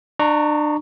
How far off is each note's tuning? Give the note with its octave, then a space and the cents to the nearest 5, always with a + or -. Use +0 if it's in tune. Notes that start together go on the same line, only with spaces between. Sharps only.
D4 +30 A#5 -5 C#6 +0